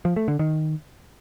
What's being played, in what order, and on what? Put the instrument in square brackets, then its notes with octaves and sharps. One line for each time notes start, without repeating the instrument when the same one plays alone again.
[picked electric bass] F3
A3
D3
D#3